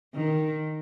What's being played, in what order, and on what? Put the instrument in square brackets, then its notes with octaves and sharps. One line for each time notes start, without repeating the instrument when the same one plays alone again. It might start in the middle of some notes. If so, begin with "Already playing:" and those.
[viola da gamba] D#3